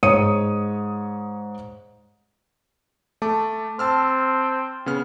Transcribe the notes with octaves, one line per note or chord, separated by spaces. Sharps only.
G#2 C#5 D#6 C#7 D#7
A3 A5 D6
C4 A5 E6 F6
C#3 B3 F6